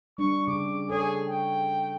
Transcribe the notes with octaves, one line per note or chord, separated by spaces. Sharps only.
G3 D4 C#6
C#3 D6
G#4 A4 C#5
G5